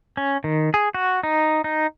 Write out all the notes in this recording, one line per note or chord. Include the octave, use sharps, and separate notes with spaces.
C#4
D#3
G#4
F#4
D#4
D#4